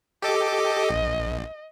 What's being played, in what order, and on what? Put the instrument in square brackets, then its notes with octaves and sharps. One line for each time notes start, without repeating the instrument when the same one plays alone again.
[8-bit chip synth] G4 A4 D6 [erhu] D#5
[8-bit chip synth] A#1